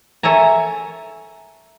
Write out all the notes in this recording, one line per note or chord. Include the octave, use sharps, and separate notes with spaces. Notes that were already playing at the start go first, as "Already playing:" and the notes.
A4 C#5 E5 G#5 A#5